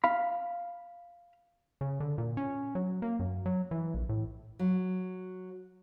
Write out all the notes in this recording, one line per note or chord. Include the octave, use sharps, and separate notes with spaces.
F5 B5
C#3
D3
A#2
C#4
F#3
A#3
F#2
F#3
E3
A#1
A2
F#3